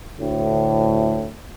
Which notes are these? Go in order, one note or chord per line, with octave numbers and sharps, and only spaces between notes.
D2 A2